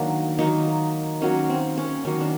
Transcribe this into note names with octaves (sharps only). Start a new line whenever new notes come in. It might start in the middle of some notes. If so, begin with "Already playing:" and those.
Already playing: D#3 F#3 A#3 D4
D#3 F#3 A#3 D#4
D#3 F#3 A#3 C#4
C4
C#4
D#3 F#3 A#3 C#4
D4